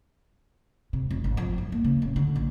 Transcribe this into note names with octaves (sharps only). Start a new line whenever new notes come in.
C3
F1
G#1
F3
G2
A#3
C#3
D1
D3
A#1